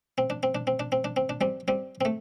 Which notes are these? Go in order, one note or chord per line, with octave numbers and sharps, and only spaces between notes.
C4
D4
C4
D4
C4
D4
C4
D4
C4
D4
G3 C4
G3 C4
C4
A3